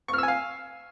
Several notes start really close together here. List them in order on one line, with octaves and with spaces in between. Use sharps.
C#6 F6 E6 G#5 F5